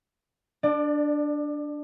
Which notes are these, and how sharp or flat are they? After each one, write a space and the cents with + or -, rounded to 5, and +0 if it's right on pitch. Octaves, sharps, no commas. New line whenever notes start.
D4 +0 D5 +30